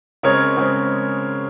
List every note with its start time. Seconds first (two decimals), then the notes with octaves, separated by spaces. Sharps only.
0.23 C#3 G#3 C4 A#4 C#5
0.57 C#3 G#3 C4